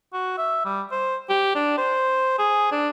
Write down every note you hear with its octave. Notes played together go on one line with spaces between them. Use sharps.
F#4
E5
G3
C5
G4
D4
C5
G#4
D4